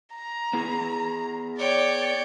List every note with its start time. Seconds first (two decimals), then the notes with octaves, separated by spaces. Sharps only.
0.15 A#5
0.53 B3 E4 G#4
1.59 C#5 D5 G5